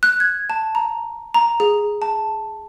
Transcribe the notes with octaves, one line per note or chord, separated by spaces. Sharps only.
F#6
G#6
A5
A#5
A#5
G#4
A5